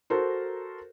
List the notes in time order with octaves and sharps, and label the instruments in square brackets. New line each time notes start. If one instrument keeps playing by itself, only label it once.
[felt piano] F#4 A4 A#4 C5